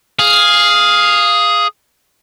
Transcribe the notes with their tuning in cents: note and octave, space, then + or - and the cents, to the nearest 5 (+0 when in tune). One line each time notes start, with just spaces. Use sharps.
G#4 +0 F5 +0